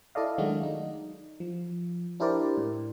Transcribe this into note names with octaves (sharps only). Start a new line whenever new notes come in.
E4 A4 D5 D#5 F5
D#3 F#3 G#3 A3 D4 F#4
D#4
F3
D4 E4 G4 A#4 C5 D5
A2